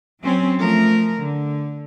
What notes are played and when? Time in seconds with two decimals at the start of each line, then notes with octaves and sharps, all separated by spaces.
0.22 F#3 C4 C#4
0.59 F3 A3 A#4
1.22 D3